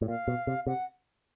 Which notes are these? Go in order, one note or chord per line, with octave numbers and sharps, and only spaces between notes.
A2
A#2 F5
B2
C3
C3 F#5